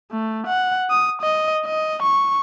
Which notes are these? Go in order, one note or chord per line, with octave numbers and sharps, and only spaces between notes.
A3
F#5
D#6
D#5
D#5
C#6